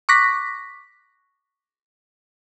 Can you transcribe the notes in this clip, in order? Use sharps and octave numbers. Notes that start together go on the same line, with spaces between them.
C#6 D6 F#6 A#6 B6